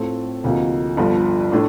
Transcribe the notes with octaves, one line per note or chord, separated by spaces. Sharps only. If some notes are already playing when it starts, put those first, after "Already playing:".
Already playing: A2 A3 C4 F4 A4
D2 C3 F3 A#3 D#4
G1 G2 F3
A2 A3 D4